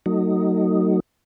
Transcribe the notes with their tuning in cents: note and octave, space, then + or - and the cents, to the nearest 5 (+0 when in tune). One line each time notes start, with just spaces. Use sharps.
F#3 +15 A3 +40 D#4 +0